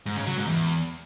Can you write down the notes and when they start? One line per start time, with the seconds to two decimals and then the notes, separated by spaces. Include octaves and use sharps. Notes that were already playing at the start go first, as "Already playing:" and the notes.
0.06 G#2
0.16 C#3
0.27 F#3
0.37 G#2
0.47 E2